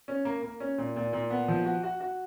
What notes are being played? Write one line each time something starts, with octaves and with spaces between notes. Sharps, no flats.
C#4
A#3
A#3
C#4
A#2
A#2
A#2
B3
F3
F#4
F#4
F#4